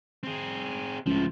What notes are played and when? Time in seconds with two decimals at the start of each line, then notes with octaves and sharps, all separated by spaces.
0.23 C4 G#4
1.06 C#2 A2 F3